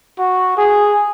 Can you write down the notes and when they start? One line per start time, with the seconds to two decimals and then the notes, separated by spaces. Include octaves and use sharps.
0.19 F#4
0.57 G#4